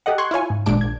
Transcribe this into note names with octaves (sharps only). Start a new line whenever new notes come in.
G4 A4 D#5 F#5
C6 C#6 F#6 G#6
E4 F4 C#5 G#5
G#2
G#1 A#2 G#3 D4 D7
A#1 G#6